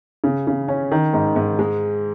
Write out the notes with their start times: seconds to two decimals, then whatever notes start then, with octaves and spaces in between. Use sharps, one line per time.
0.24 C#3
0.47 C#3
0.68 C#4
0.92 D#3
1.14 G#2
1.36 G#2
1.59 G#3